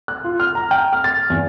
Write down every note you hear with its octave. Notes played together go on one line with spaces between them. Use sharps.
F#6
F4
F6
A#5
G5
F6
A6
E2